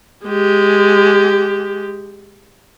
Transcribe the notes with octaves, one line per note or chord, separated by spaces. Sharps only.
G#3 G4